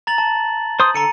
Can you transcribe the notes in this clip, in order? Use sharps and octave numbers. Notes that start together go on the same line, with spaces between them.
A#5 A6 F#7
A5
C5 C6 D#6
D3 A4 A#5 C#7 D#7